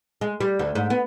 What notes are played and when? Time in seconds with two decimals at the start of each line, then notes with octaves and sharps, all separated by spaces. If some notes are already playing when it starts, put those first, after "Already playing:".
0.21 G#3
0.40 G3
0.59 D2
0.75 G#2
0.90 B3